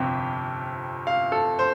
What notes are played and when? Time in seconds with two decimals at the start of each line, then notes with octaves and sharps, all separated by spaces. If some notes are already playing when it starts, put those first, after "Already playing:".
Already playing: G1 F2 C3 G5
1.07 F5
1.32 A4
1.59 C5